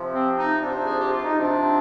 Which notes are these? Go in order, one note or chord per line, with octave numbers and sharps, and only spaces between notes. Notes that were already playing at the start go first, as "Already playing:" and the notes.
Already playing: C3 F3
C4
D#4
C3 F3 D4
G#4
G4
F4
D#4
C3 F3 D4